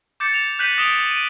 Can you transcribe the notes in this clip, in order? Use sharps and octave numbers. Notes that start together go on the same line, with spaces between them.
D6 G6 A6 C#7
F7
F#6 G6 B6 D#7 F#7
D#6 A#6 D7 E7 F7 G7
E7
D#7